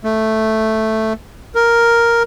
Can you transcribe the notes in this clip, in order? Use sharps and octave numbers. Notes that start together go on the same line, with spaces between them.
A3
A#4